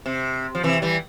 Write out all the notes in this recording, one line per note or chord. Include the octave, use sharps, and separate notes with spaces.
C3
F3
C3 E3
E3 G3